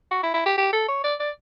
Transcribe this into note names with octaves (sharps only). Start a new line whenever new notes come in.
F#4
E4
E4
G4
G4
A4
C#5
D5
D5